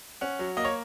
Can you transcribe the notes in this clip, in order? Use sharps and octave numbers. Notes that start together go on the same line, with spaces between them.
C#4 F#5
F#3
A#3 D#5
C#5